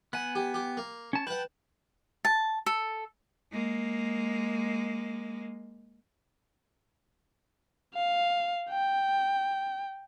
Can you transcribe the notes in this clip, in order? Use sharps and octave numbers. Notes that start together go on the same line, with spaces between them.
B3 F#5 G#5
G4
G4
A#3
C#4 A5
B4 F#5 G5 A5
A5
A4
G#3 A#3
F5
G5